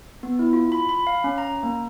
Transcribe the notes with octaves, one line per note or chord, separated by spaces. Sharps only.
B3
E4
F4
B5
B5
F5
C#4
A#5
A#3